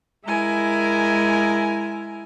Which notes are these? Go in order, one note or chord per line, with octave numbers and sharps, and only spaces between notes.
G#3 E4 A#4 G#5